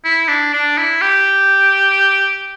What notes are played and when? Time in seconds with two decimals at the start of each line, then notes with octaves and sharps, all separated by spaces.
0.05 E4
0.29 D4
0.53 D4
0.78 E4
1.02 G4